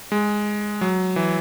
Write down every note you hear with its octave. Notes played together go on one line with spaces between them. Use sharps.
G#3
F#3
E3